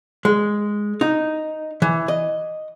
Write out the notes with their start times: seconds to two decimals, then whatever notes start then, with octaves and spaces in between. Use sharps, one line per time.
0.25 G#3
1.01 D#4
1.82 E3
2.08 D#5